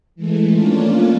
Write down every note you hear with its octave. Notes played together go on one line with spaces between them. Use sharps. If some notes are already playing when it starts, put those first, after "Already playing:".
E3 G#3 A3
F3 A3 A#3 C#4 D4 F4